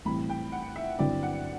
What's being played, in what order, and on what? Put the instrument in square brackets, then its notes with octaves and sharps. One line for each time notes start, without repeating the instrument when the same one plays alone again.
[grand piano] A1 A2 G3 C4 [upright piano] B5
[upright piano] G5
F#5
E5
[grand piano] G1 G2 F#3 C4 E4 [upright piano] D5
[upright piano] F#5